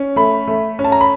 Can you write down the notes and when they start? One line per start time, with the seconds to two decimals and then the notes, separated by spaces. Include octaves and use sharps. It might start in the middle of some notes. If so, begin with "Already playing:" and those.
Already playing: C#4
0.16 A3 B5
0.48 A3
0.79 C#4
0.84 A5
0.92 A#5
1.01 B5